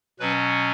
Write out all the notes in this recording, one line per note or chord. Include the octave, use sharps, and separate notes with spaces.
B2 F#3 C#4 B4